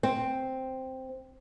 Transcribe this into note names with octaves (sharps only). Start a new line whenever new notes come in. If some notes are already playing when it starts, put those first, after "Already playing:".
C4